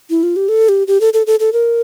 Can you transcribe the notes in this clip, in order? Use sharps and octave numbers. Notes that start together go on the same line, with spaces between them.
E4
F4
G4
A4
G4
G4
A4
A4
A4
A4
A#4